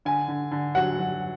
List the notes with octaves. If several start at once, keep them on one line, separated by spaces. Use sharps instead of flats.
D3 G#5
D3
D3
F#3 F#5
F#3